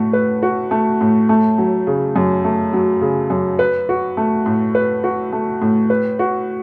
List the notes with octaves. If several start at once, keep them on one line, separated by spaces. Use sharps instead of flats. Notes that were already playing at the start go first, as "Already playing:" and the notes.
Already playing: A2 A3 F#4
B4
F#4
A3
A2
A3
F#3
C#3
F#2
A3
F#3
C#3
F#2
B4
F#4
A3
A2
B4
F#4
A3
A2
B4
F#4